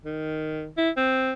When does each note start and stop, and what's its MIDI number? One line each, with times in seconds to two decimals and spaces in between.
0.05 0.69 51
0.77 0.90 64
0.97 1.33 60